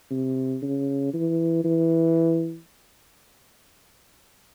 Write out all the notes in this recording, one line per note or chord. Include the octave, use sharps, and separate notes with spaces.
C3
C#3
E3
E3